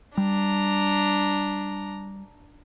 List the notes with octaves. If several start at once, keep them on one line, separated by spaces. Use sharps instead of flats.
G3 D4 A#5